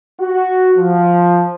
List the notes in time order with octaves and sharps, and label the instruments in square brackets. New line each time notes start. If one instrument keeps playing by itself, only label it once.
[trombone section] F#4
F3